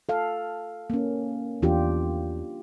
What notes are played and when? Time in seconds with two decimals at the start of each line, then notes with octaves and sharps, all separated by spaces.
0.09 A4 F5
0.90 A#3 C#4
1.62 E2 D4 F4 G4